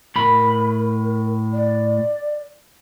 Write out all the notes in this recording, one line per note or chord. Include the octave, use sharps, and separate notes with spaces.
A2 A#4 B5
D5